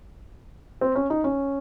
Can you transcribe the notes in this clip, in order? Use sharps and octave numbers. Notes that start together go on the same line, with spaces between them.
C4
C#4
D#4
C#4